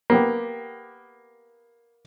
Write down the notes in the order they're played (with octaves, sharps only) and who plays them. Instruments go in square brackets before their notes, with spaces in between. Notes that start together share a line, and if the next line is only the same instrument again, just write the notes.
[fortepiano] A#3 B3 G4